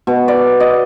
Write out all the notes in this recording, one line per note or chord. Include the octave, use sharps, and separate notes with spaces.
B2
D5
D#5